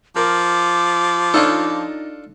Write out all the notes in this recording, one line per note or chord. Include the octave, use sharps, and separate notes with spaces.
F3 A#4 D6
D4 D#4 F4 A4 C#5 D#5